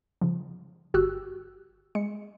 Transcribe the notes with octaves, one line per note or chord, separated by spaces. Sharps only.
C#3 F3
G1 F#4 G4 E6 F#6
G#3 C#7